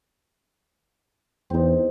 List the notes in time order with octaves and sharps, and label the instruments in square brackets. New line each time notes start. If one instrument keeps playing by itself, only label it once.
[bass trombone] E2 [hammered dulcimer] C4 D#4